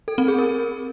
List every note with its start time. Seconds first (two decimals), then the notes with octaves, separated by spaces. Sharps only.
0.08 A4
0.18 C4
0.28 G#4
0.38 A#4